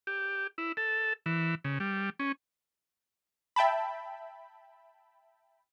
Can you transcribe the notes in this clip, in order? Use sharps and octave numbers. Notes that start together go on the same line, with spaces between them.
G4
E4
A4
E3
C#3
G3
C#4
E5 G5 A5 B5